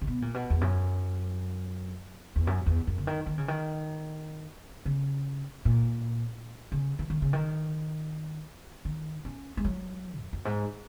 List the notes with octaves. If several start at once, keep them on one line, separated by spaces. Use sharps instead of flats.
C#3
B2
A#2
B2
E2
F#2
E2
F#2
E2
F#2
C#3
D#3
D#3
C#3
D#3
C#3
A#2
C#3
E3
D#3
C#3
D#3
D#3
C#4
G#3
F#3
E2
F#2
G#2